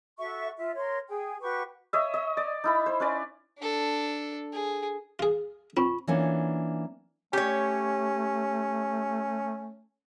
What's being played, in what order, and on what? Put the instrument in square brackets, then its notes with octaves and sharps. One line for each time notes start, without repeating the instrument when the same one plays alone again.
[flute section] F#4 A4 E5 C#6
F4 E5
A#4 C#5 C6
G#4 G5
F#4 G4 B4 C#6
[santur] C#5 D#5 E5
D#5
D5
D#4 E4 B5
C5
C#4 B4 D5
[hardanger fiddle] D4 A4
G#4
[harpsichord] F4 G#4
[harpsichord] C4 [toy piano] F4 C#6
[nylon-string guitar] E3 A#3 B3 C#4 D4 F4
[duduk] A3 [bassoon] C#4 [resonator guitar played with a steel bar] G4 C#5